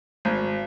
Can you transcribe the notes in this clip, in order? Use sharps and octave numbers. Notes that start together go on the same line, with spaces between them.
G#1